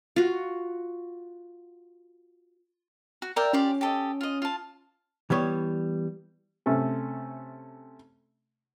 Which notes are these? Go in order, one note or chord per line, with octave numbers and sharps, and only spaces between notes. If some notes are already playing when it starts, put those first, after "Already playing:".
F4 F#4
F#4
A#4 D5 E5 G5
C#4 F4 G4 D5
G4 A4 D#5
F4 D#5
F4 A5
E3 G3 B3 C#5
C3 A3 C#4 A4